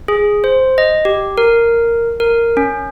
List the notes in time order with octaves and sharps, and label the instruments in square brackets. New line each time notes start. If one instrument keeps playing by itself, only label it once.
[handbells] G#4
C5
D#5
G4
A#4
A#4
C#4